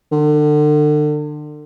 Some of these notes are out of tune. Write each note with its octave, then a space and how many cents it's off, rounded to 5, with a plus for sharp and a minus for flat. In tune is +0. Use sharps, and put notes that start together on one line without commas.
D3 +35